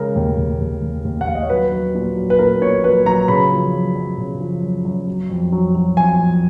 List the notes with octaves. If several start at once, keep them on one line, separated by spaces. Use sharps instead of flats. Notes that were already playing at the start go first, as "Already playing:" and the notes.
Already playing: C#3 G#3 A#4
D#2
D#2
D#2
D#2
D#2
F#5
D#2 F5
D#5
C#5
F#3 B4
F#3
A#2
F#3
B4
A#2 A#4
A#2 C#5
F#3 B4
F#3 A#5
C#3 B5
F3
F#2
F#2
C#3
F3
F#2
F#2
F#3
F2
F#3
F#3
F2 G#5
F2